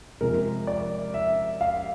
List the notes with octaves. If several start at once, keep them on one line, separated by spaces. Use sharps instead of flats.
C3 F3 G#3 A#4
D5
E5
F5